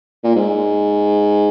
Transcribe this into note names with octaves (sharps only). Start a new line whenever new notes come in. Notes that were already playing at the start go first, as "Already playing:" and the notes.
A#2
G#2